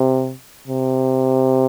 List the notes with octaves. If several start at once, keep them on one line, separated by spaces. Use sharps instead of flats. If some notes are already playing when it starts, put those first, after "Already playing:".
Already playing: C3
C3